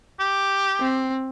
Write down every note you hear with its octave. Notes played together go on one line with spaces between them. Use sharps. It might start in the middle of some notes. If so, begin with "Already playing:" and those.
G4
C4